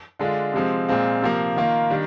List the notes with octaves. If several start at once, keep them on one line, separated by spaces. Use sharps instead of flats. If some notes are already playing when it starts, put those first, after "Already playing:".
D3 G#3 D4 F4
C3 F3 G#3 C4
A#2 G#3 C4 F4
C3 F3 A#3
D#3 A#3 F4
D#3 G3 D4